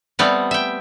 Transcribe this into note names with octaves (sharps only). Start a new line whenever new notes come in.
G3 A3 B3 C4
E5 G5